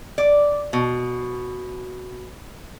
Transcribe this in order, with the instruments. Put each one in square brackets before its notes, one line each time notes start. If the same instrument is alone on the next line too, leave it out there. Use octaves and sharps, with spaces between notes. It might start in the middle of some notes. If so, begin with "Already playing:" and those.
[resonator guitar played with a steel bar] D5
B2